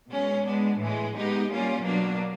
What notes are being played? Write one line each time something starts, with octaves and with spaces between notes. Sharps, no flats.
B2 G#3 C#4
G#3 B3 D4
A2 E3 G#3
G#3 B3 D#4 G4
G3 A#3 C#4 F4
B2 F#3 A#3 D4